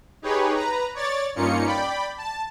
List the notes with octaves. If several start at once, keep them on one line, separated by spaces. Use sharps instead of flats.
D#4 G4 G#4 B4 C#5
B4 A#5
C#5 D5 A6
G2 A#3 C#4 D#4 F4 C#7
D5 G5 B5
A5